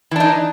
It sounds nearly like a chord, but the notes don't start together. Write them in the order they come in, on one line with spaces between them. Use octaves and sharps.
E3 D4 D#4